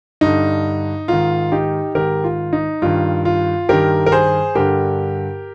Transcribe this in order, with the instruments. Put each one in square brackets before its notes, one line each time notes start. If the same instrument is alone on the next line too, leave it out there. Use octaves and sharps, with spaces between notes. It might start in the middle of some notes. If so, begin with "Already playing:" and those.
[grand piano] G2 D3 D#4
G#2 D#3 F4
D#4 G4
G#2 D#3 G4 A#4
F4
D#4
G2 D#3 F4
F4
G2 D#3 G4 A#4
A#4
G#4 C5
G2 D3 G4 A#4